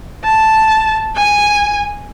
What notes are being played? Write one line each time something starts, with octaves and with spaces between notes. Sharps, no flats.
A5
G#5